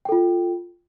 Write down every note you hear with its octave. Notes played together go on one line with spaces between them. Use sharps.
F4 A4 G5